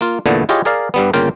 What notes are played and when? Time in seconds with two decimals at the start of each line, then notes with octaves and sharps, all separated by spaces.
0.01 A#3 F4
0.26 E2 A#2 D3 A3 B3
0.49 E4 F4 G4 G#4 C#5 D#5
0.65 G#4 A#4 D5 F5
0.94 G2 G3 B3
1.13 G1 C#3 A#3 F4 A#4 G5